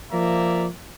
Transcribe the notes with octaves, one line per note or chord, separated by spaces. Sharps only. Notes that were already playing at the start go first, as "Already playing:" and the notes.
F3 A#3 D5 E5 A#5